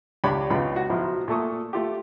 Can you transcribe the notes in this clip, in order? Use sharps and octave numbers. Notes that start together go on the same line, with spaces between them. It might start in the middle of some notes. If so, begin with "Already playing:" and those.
C#2 D4 G4 C#5 B5
C#2 C#3 B3 D#4 F4 B5
F#4
B1 B2 F3 E4
A#2 A3 A4 C#6 D#6
A3 F4 G4